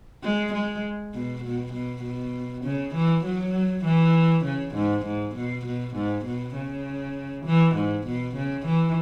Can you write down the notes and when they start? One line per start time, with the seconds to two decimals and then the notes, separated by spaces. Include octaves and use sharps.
0.24 G#3
0.53 G#3
1.14 B2
1.43 B2
1.73 B2
2.03 B2
2.64 C#3
2.95 E3
3.24 F#3
3.85 E3
4.45 C#3
4.75 G#2
5.05 G#2
5.36 B2
5.66 B2
5.95 G#2
6.25 B2
6.55 C#3
7.46 E3
7.75 G#2
8.06 B2
8.36 C#3
8.66 E3